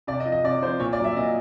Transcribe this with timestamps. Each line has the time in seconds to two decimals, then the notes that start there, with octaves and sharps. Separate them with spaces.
0.07 C3 D5
0.20 D#5
0.25 F3
0.32 D#5
0.44 C3 D5
0.62 F3 C5
0.80 A#2 C#5
0.93 D5
0.99 F#3
1.04 E5
1.16 A#2 D#5